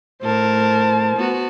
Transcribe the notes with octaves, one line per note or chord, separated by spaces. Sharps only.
A2 A#4 C5 A5
B3 F#4